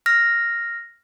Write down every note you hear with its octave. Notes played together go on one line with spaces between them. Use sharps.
F6 A#6